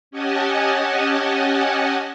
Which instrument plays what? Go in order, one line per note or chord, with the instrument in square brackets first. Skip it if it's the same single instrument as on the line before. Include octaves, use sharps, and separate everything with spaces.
[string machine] C#4 G4 D#5 F#5 G#5 A5